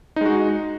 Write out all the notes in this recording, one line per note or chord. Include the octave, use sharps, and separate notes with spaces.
G#3 D#4 F#4